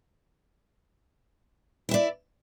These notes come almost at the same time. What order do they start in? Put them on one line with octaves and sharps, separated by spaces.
E4 E5 D5